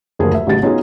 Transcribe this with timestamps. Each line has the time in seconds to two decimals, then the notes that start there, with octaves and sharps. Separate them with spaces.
0.19 F#1 D2 F3 G#4 A#4
0.34 E5
0.47 A1 G2 C#3 F#3 A6
0.62 B3 C#4 D#4 F4 F#4 G#4